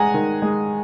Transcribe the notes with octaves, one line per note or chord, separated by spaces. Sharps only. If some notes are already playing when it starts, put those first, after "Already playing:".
Already playing: G#3 F#5 G#5 A#5
D#3
G#3